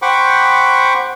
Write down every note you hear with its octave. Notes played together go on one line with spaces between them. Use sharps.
C5 F#5 G5 B5 C#6 D6